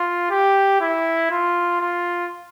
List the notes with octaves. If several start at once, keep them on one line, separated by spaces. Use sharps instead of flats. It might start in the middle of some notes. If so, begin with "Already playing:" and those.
Already playing: F4
G4
E4
F4
F4